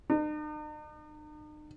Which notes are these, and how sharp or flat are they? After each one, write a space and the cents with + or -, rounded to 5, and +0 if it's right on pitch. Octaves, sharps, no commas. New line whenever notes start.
D#4 -45